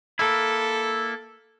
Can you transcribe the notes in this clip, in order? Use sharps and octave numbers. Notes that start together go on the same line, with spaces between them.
A#3 E4 A4